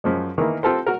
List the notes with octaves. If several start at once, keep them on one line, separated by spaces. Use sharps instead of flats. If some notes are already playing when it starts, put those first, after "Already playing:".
F#2 F3 G#3
D#3 E3 A#3 E4
C4 F4 G4 A4 A#4 C5
F#4 A#4